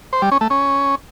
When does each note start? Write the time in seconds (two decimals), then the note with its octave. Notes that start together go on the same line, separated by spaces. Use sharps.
0.13 C5
0.22 G3
0.32 C#4
0.41 A3
0.50 C#4